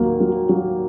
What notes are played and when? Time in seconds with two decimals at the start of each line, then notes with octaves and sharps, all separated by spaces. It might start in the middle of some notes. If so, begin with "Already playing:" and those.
Already playing: D#2 F#3 A#3
0.20 F#3
0.49 F#3